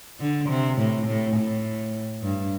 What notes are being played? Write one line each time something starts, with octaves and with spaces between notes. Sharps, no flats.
D3
C3
A2
A2
A2
G2